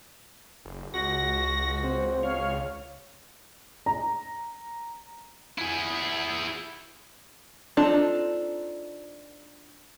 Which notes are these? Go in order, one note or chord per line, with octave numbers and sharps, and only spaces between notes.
F#1
C#2 F#4 A#6
C4
C#5 F5
A#5
E4 G#4
C4 D4 D#4 F4 A4